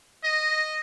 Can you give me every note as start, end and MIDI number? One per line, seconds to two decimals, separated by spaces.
0.23 0.79 75